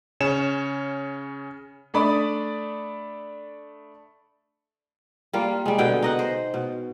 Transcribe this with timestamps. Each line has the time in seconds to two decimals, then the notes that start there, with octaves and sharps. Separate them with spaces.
0.20 C#3 C#4 C#5 E7
1.94 A3 D4 D5 B5 D#6 A6
5.33 G3 A#3 F4
5.66 G3 G#3
5.78 B2 D3 G#4 G5
6.03 D#4 D#5 F#5
6.19 C5
6.54 B2